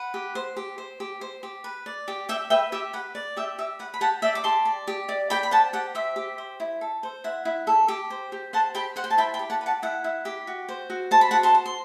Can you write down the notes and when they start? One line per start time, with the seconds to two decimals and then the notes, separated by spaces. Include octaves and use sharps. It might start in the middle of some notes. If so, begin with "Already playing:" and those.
Already playing: B4 F#5
0.14 G4
0.35 C5
0.57 G4
0.78 C5
1.00 G4
1.21 C5
1.43 G4
1.64 B4
1.86 D5
2.08 G4
2.29 G4 E5 G5
2.50 B4 E5 G5
2.72 G4 E5
2.93 B4 F#5
3.15 D5
3.36 G4 E5 G5
3.58 G4 E5
3.79 B4 F#5
3.94 B5
4.01 G4 F#5 A5
4.22 D5 E5 G5
4.35 D6
4.44 G4 A5 C6
4.65 D5
4.87 G4
5.09 D5
5.30 G4 G5 B5
5.43 B5
5.51 C5 F#5 A5
5.73 G4 F#5
5.95 C5 E5
6.16 G4
6.38 C5
6.60 E4
6.81 A4
7.03 C5
7.24 E4 F#5
7.45 E4
7.67 A4
7.88 G4
8.10 C5
8.32 G4
8.53 C5 F#5 A5
8.75 G4 G5 B5
8.96 C5 F#5
9.04 G5
9.10 A5
9.17 E4 G5 B5
9.34 G5 B5
9.39 G4
9.50 F#5 A5
9.61 B4
9.66 F#5 A5
9.83 E4 F#5
10.04 E4
10.25 G4
10.47 F#4
10.69 C5
10.90 F#4
11.11 C5 A5
11.21 B5
11.31 F#4 F#5 A5
11.43 A5 C6
11.55 C5
11.66 C6